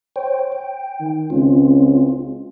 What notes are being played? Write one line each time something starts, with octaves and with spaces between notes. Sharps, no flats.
C5 C#5 G5
G5
D#3
C#2 C4 C#4 F4